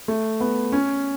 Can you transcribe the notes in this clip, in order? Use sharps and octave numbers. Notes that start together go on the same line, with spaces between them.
A3
B3
C#4